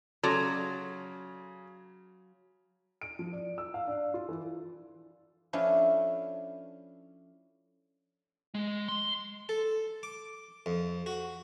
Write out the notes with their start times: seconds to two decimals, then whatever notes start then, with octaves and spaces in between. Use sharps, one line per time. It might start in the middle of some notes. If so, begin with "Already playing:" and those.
0.23 C#3 F#3 A4 D5 A#5 C6 G#6
3.01 D7
3.19 F3
3.32 D5
3.58 E6
3.74 F5
3.87 D4
4.14 F4
4.29 E3
5.53 F3 A3 C#4 D4 E4
8.55 G#3
8.88 C6
9.49 A4
10.03 D6
10.66 F2
11.06 F#4